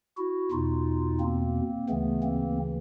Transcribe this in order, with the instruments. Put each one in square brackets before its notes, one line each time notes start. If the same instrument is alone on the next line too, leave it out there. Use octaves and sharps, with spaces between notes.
[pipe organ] E4 F#4
E2 B2 D#4 F4
A#3 C4
D2 C#3 E3 A3 B3
A#3 C4